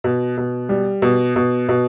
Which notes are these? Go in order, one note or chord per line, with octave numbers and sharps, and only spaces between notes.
B2
B2
G3
B2
B2
B2